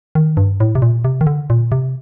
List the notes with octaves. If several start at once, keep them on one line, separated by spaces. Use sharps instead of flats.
D#3
G2
A2
C3
A#2
C3
D#3
D3
A#2
C3